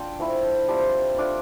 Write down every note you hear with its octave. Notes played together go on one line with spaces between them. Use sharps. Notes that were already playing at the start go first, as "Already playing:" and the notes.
Already playing: D4 F4 G5 A5
F3 A3 E4
G3 C4 F4 A5
A3 D4 F4